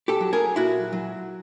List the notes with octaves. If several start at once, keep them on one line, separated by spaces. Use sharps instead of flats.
G4 A4
F#3
G#4 A#4
A#2 E4 F#4
F#3